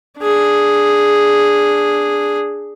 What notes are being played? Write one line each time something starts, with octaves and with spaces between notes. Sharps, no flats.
D4 G#4